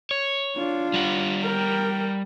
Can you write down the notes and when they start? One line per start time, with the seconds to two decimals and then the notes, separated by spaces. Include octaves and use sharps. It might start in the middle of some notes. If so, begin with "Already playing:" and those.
0.11 C#5
0.56 D4 F4
0.94 G3 F#5
1.43 A#4 G5